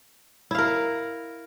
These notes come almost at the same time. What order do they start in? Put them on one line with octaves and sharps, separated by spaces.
E4 F5 A#4